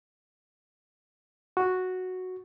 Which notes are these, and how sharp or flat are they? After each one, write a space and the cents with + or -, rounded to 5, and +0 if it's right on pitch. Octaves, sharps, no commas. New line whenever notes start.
F#4 -5